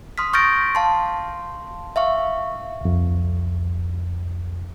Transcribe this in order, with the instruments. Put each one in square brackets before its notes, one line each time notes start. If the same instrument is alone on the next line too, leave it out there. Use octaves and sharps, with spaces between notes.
[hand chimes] C6 D#6 F6 B6
C#6 F6 G6 A6 A#6 D7
F5 A5 C6
E5 F5 C#6
[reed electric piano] C2 F2